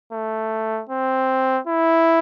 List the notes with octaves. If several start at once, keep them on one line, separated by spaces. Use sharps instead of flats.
A3
C4
E4